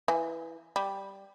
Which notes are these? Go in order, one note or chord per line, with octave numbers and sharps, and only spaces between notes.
E3
G3